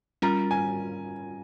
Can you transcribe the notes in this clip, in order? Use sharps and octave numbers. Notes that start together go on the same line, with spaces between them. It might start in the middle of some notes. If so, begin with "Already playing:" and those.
G3 C#4 F4 A#4 A#5
G#5